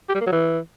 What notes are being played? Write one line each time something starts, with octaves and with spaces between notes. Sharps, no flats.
G4
G3
A#3
F#3
E3